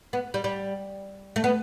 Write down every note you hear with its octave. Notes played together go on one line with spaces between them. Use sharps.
B3
G3
G3
A3
B3